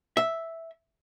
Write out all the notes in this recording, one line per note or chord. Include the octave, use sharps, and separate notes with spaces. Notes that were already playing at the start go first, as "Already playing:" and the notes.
E5